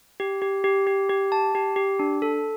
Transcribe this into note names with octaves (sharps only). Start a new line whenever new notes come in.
G4
G4
G4
G4
G4
A5
G4
G4
D4
A4